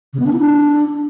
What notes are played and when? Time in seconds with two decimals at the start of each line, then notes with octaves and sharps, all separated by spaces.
0.13 C#3
0.20 B3
0.26 D4
0.33 E4
0.39 D4